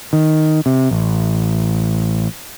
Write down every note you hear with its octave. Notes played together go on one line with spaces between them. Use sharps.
D#3
C3
A1